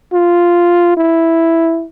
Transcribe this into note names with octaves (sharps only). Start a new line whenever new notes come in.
F4
E4